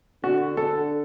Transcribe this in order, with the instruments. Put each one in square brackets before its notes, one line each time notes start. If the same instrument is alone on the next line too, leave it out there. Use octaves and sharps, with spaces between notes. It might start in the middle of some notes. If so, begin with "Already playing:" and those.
[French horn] D3 [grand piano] F#4
[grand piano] A4